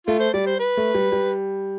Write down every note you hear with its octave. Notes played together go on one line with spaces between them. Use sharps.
A3 F4
C5
G3 D5
C5
B4
A3
G3
G3